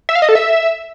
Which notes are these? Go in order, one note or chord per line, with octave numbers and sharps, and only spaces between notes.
E5
F5
D#5
A4
E5